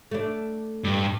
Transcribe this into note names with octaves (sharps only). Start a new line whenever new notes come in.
A3 D4
G2